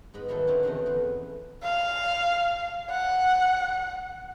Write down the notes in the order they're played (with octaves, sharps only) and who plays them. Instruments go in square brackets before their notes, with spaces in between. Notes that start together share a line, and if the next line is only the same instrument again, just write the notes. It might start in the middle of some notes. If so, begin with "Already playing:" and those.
[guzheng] G#2 B3 D#5 B5
D#3 E3 F#3 B3 E4 A4
D3 C4 C#4 D#4 E4 F#4
E2 B2 E3 A3 D#4 D#5
F2 B3
[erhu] F5
F#5